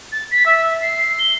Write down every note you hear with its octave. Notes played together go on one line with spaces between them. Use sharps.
A6
B6
E5
C7
G7